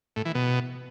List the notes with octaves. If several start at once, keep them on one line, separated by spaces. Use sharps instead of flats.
A2
E3
B2